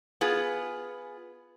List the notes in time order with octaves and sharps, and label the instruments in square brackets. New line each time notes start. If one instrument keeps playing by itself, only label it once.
[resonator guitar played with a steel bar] B3 F4 G#4